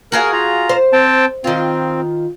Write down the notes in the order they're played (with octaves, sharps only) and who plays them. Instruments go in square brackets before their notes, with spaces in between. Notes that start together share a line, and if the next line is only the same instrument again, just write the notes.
[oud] F#4 G#4 F5 [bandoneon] A#4
[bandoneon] F4 A#5
[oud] C5
[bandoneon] C4 G5 A5
[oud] D#3 F4 [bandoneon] C4